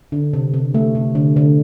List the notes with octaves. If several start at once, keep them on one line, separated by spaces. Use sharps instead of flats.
D3
C3
C3
A3
C3
D3
D3